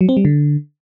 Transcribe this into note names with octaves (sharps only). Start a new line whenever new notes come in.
F#3
C4
G3
D3